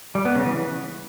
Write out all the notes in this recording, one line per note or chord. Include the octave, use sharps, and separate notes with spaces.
G3
B3
C#3
E3